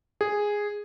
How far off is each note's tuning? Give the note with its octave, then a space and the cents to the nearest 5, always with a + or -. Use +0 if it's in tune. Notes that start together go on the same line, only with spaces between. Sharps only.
G#4 -5